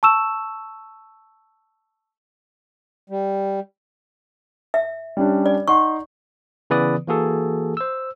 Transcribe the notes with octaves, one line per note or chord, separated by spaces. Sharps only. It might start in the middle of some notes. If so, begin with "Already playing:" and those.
A5 C#6 E6 E7
G3
E5
G3 C#4 D4
D5
D#4 F#5 C6 C#6
C#3 E3 B3 B4 D5 D#6
E3 A#3 F#4 G#4 A4
C5 E6